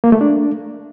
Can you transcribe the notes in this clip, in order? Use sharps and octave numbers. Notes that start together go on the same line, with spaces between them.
A#3
A3
D4